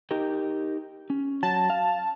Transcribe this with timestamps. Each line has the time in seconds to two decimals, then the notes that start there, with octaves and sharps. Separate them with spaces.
0.11 D#4 G4 A#4
1.10 C#4
1.43 F#3 A5
1.70 F5